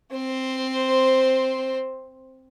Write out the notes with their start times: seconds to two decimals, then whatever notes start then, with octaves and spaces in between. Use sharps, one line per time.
0.13 C4 C5